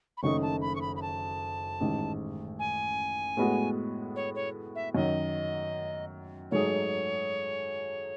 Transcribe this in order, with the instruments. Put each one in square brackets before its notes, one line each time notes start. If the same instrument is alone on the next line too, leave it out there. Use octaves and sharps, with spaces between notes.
[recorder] B5
[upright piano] F#1 F#2 D#3 A3 D#4 [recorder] C#6
[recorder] A5
B5
C#6
B5
B5
A5
[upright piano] A1 G#2 D#3
[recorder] G#5
[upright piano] A2 G#3 B3 F#4
[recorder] C#5
C#5
E5
[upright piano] F#2 D#3 F#3 [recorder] D#5
[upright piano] G#2 F#3 A3 D#4 G#4 [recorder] C#5